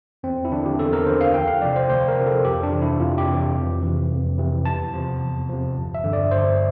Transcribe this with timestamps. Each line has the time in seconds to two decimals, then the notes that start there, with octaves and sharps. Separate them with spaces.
0.23 E2 C4
0.45 E4
0.51 D3 F3 D4
0.66 G4
0.79 E2 A4
0.93 A#4
1.06 D3 F3 C5
1.21 F5
1.34 D2 G5
1.47 F5
1.62 C3 F3 D5
1.76 C5
1.89 D2 C5
2.08 A#4
2.17 C3 F3
2.26 A4
2.45 F2 G4
2.63 D4
2.72 C3 E3
2.82 E4
3.00 F2 F4
3.18 G4
3.28 C3 E3
3.55 F2
3.83 C3 E3
4.11 F2
4.38 C3 E3
4.65 E2 A5
4.93 C3 F3
5.21 E2
5.49 C3 F3
5.76 G1
5.95 E5
6.04 G2 D3 F3
6.13 D5
6.31 G1 C5